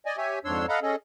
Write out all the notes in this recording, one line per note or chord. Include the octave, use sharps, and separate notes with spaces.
D5 D#5 G#5
G4 C#5 E5 G#5
F2 G#2 D4 C#5 C6 E6
A4 D#5 F5 F#5 A#5 B5
C#4 G#4 A4 D#5